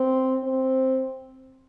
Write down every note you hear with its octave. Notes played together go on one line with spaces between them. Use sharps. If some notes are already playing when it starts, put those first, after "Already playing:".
Already playing: C4
C4